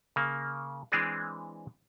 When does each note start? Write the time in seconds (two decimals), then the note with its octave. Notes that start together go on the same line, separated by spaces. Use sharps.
0.16 C#3 A#3
0.92 E3 G#3 C4 D4 G#4